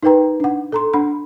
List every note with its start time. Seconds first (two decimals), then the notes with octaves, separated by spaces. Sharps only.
0.03 D#4 A#4 B4 G5 A#5
0.40 D4 F#5
0.72 A4 A#5 C6
0.93 D4 F#5 B5